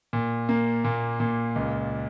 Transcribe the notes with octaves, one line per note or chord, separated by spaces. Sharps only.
A#2
A#3
A#2
A#2
C#2